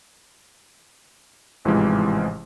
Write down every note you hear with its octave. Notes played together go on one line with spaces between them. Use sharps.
A1 G#2 C3 E3 F3 G#3